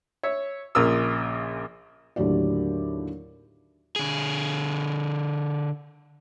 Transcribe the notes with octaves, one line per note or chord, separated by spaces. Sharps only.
C#5 E5
A#1 A#2 C#3 A#4 D#6 E6
D#2 A2 D3 F#3 G4 D5
D3 G#4